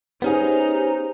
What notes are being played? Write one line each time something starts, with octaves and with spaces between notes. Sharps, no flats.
B3 C#4 D#4 G4 G#4 C5 A#5